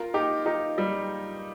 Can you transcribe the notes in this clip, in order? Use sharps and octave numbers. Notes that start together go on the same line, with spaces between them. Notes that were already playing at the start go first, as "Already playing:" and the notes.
Already playing: F4 A#4
D#4 G4
D#4 G4
G3